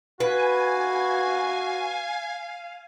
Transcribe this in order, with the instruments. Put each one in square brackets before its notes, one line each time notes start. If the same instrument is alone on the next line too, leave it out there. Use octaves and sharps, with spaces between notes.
[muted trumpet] F#4 [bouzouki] B4 [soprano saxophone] F5 [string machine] G#5